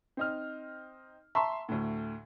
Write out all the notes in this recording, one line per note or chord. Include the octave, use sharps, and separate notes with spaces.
C4 D#4 F6
E5 A5 A#5 C6 C#6
D2 A2